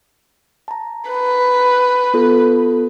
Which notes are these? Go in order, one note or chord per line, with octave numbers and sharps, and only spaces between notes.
A5 A#5
B4
B3 F4 A4